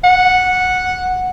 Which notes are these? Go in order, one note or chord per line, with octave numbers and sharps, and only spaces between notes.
F#5